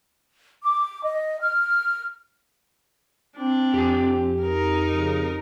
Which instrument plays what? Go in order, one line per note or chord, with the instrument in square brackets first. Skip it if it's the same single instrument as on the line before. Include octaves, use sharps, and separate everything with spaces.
[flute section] D6
D#5
F6
[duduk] C4 [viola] D4
[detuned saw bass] F2 [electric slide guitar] G4 G#5
[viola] D#4 A#4
[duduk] C#3